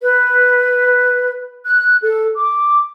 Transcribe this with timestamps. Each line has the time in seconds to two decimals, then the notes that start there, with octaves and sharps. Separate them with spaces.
0.02 B4
1.65 F#6
2.02 A4
2.37 D6